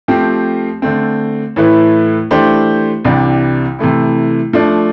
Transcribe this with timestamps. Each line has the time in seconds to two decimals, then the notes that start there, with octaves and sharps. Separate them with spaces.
0.08 F3 A3 C4 G4
0.82 D3 A3 C4
1.56 A2 E3 A3 E4 B4
2.31 E3 A3 D4 G4 C5
3.05 C2 C3 E3 G3 D4
3.79 C3 E3 A3 E4
4.53 F3 A3 D4